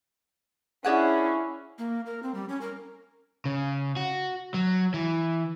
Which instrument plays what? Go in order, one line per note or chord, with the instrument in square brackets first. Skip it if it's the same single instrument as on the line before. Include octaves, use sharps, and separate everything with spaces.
[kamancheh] C#4 E4 [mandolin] D4 G#4 F#5
[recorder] A#3
A#4
C4
G3
C#4
A#4
[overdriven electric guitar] C#3
F#4
F#3
E3